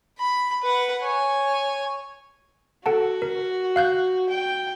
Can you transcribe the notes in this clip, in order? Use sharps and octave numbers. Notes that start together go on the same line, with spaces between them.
B5
B4 F#5
C#5 G#5
F#4 A4 F#5 A5
A#4
F5 F#6 G6
G5